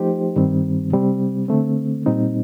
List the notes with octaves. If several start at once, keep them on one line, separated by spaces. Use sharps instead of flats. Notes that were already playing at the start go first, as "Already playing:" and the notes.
Already playing: F3 A3 D#4 G4 C5
G2 D#3 G3 C4
C3 G3 C4
D3 A3 C4
A#2 G3 C4 D#4